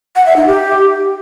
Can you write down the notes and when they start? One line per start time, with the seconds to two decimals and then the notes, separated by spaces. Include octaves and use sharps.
0.16 F#5
0.26 E5
0.36 D#4
0.46 G4